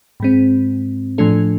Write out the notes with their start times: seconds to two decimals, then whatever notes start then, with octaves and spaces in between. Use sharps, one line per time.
0.20 G#2 G#3 C4
1.18 A2 F3 A3 D4 A4